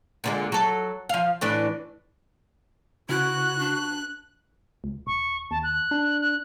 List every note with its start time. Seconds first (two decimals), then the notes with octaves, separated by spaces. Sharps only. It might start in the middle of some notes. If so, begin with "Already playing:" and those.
0.24 A#2 D3 G#3
0.52 F#3 A4
1.09 F3 F5
1.41 A2 E3 D4
3.09 C#3 E4 F#4 F#6
3.59 D4
4.84 C#2
5.07 D#1 C#6
5.51 D#2 A5
5.63 F#6
5.91 D4
6.20 F#6